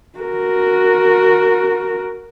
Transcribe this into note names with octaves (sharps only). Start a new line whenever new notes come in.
F#4 A#4